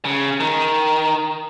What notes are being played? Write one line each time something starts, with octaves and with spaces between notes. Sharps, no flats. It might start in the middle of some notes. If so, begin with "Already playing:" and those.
C#3
D#3